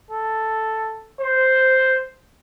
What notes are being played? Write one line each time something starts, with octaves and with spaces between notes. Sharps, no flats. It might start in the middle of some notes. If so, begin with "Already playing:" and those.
A4
C5